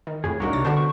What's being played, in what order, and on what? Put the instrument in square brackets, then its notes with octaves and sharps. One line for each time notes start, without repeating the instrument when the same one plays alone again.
[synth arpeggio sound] D#3
[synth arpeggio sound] F2 A2 [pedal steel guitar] G#4
[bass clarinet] C2 [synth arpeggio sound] A#3 D#4 F#4 [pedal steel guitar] D4 A#4 C#5
[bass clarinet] C3 [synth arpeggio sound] A6
[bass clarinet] D3 [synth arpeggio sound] B3 D4 F#4 [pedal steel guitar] C5 A5
[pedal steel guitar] C#6